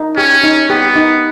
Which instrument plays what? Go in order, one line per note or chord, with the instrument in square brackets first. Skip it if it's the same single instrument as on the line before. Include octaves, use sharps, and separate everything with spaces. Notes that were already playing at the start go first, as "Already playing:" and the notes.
Already playing: [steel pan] D#4
[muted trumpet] C#4 [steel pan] G4
[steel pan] D#4
[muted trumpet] B3 [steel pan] G4
[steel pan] D#4